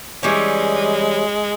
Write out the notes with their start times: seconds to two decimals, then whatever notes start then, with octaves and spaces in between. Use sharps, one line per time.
0.23 E3 G3 G#3 C#4